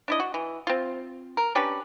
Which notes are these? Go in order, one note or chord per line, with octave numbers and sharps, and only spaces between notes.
D4 E4 D#5
F#4
E3
C4 F4
A#4
C#4 D4 G4 B4